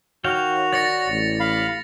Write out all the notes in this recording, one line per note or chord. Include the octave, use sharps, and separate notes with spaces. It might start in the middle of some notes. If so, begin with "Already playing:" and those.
D#3 F#4 C#5 F5 G5 F7
C#5 D5 A6 A#6 C#7
A1
F5 B5